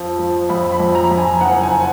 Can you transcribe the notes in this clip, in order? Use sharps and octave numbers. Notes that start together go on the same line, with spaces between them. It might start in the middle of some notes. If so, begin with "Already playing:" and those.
Already playing: F2 F3
F3
F2 B5
B5
F2
A#5
F2
G#5
F#1 F#5
G#5